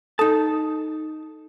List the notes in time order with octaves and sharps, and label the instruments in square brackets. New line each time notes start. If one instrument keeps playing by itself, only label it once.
[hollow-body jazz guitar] D#4 A5 [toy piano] A4